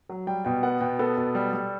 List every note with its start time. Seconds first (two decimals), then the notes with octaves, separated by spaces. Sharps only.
0.09 F#3
0.27 G3 G5
0.45 B2 G5
0.63 B3 F#5
0.81 B2 G5
0.99 B3 A4
1.17 B2
1.35 G3
1.53 G3